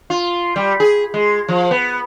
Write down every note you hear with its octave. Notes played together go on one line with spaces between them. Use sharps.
F4
G3
G#4
G#3
F3
B3